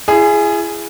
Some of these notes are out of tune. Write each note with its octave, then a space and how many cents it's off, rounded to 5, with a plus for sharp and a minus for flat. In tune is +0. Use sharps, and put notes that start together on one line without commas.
E4 +40 G#4 +0